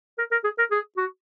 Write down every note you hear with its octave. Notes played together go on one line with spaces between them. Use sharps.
A#4
A#4
G#4
A#4
G#4
F#4